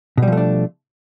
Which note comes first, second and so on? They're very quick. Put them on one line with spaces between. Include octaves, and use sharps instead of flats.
B2 G3 F3 A3 D4